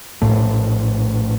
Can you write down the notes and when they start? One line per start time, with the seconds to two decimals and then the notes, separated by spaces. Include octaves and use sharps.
0.22 A#1 A2 A3